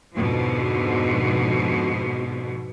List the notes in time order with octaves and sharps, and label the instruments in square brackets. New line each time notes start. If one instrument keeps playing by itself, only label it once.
[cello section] F2 G#2 B2 D3